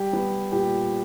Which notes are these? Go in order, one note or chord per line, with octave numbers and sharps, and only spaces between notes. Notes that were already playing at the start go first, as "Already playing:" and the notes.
Already playing: G3 G4
B3
A#2 G4